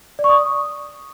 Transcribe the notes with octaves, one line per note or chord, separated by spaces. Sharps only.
D5
C#6
D#6